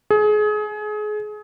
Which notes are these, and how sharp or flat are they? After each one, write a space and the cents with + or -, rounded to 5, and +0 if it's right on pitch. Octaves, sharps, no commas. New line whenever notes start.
G#4 +30